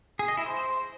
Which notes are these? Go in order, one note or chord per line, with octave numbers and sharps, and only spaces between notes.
G#4
D#5
E4
C5